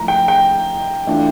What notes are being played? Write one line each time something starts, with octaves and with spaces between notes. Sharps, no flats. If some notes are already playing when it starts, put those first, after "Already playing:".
Already playing: F3 A3 E4 A#5
G5
G5
E3 A3 D4 F4